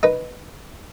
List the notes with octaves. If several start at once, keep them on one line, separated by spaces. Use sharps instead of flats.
D#4 B4